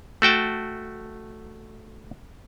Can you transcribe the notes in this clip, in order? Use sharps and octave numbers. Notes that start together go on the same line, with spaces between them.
A3 F#4 G5 A5